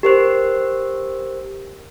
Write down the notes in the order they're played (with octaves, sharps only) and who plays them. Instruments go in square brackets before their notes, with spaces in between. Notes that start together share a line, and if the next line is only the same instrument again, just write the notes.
[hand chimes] G4 A#4 C5